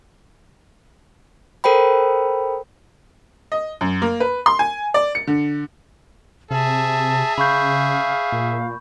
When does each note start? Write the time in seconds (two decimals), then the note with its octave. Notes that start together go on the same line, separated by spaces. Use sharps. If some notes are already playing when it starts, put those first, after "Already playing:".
1.64 A4 A#4 C5 G5 B5
3.52 D#5
3.81 F#2
4.02 A#3
4.20 B4
4.46 C6
4.59 G#5
4.94 D5
5.15 C#7
5.27 D3
6.51 C3 G#4 E5 A5
7.38 C#3 F5 B5 C#6 G6
8.32 A#2